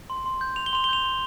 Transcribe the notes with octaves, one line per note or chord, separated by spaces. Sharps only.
C6
C6
G6
C6 F7
G7
C6 F7
G7
G6 F7
C6